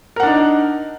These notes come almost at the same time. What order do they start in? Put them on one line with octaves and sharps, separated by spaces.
A#4 F#5 D4 D#4